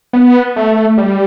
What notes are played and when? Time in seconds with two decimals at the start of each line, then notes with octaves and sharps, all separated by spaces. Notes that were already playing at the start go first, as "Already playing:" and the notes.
0.13 B3
0.56 A3
0.98 G3